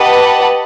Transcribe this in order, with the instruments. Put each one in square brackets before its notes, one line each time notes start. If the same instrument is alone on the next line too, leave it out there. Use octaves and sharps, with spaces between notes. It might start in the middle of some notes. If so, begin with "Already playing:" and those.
Already playing: [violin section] G4 B4 D#5 F#5 A5